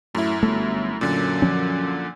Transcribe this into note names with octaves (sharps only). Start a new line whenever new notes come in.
F#2 A2 E4
G1 A3
F#2 A#2 D3
F3 C#4